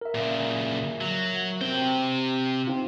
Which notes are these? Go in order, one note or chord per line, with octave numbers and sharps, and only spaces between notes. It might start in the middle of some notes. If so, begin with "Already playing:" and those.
A#4 E5
A#2 C#3
F#3
C3 C4 G5
C4 D#4 F4